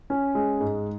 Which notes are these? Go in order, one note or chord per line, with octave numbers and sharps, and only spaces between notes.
C#4
G#3
G#2